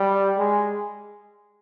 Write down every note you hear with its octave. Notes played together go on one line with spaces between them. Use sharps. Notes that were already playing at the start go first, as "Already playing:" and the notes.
Already playing: G3
G#3